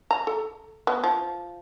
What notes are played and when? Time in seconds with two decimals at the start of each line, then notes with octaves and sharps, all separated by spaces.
0.11 A#5
0.27 A4
0.87 B3
1.04 F3